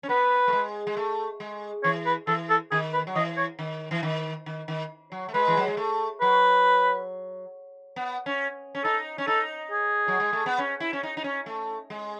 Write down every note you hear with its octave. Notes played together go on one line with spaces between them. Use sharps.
C#4
B3 B4
A3
G#3
G#3
A3
G#3
E3 C#5
B4
E3 A4
A4
D#3 G#4
B4
F#3
E3 D#5
C#5
D#3
E3
D#3
D#3
D#3
F#3
A3
G#3 B4
E3
F#3
G#3
A3
F#3 B4
B3
C#4
C#4
D#4 A4
C#4
D#4 A4
G#4
F#3
G#3
A3
B3
C#4
E4
C#4
D#4
D#4
C#4
A3
G#3